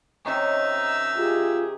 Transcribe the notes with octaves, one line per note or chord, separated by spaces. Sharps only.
C3 D#3 C#4 D#4 E5
F4 G4 G#4